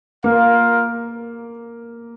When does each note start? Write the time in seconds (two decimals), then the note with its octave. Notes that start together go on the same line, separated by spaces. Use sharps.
0.24 A#3 F4 A#4 F5